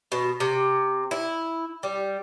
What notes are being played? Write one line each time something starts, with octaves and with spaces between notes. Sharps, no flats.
B2
C3
E4
G3